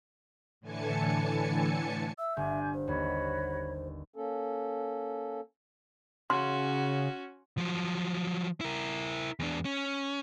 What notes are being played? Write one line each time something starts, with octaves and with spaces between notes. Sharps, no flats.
A2 D3 E3 G#5 A5 C#7
E5 E6
G1 D4 G#5 G6
C5
D#2 F#4 C#5 B5
A#3 C#4 A4
C#3 C#4 F#4 C6
F3 F#3
E4 A#4
E2 D4
C#4